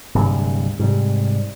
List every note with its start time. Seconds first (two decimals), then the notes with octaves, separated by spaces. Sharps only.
0.15 D1 G2 C3
0.79 G#2 C3 G3